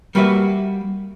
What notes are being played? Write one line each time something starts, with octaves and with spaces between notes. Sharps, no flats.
G3 A#3 F#4 B4 E5